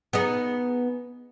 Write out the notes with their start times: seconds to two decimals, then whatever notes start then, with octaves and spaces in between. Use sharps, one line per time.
0.13 B3 D#4 G#4